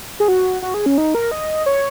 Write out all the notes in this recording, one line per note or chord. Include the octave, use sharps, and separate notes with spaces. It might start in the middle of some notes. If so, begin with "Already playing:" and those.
G#4
F#4
F#4
G#4
C#4
D#4
A#4
D#5
C#5